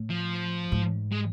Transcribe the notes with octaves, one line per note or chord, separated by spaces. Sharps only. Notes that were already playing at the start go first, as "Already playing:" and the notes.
Already playing: A2
F3
G#2
G#3